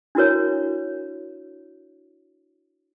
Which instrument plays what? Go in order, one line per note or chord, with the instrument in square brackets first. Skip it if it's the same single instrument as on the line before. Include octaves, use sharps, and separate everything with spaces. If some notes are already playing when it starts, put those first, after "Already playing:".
[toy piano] D4 E4 F#4 A#4 C#5